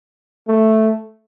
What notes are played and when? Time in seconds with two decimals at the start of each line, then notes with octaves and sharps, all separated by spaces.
0.48 A3